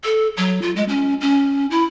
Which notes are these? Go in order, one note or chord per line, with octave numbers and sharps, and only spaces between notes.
A4
F#3
F4
G#3
C#4
C#4
E4